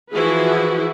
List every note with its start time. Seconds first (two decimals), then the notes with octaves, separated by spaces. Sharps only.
0.11 E3 F3 E4 F#4 G#4 B4